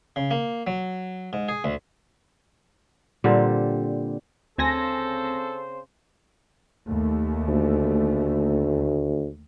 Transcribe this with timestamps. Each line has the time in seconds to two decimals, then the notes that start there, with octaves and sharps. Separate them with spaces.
0.16 C#3
0.31 A#3
0.67 F#3
1.33 G#2
1.49 G#4
1.64 D2
3.24 A#2 D3 G3 C4
4.58 D2 C#3 C4 A4 C5 G#5 A#6
6.89 D#2 A3
7.48 D2